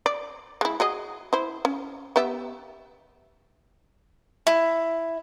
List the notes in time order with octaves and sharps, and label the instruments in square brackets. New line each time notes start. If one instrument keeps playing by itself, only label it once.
[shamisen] D5
G#3 E4
F#4 G#4 D#5
E4 C5
C#4
B3 G4 E5
[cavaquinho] E4